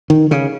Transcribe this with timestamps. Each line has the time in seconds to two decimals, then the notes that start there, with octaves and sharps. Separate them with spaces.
0.10 D#3
0.31 C#3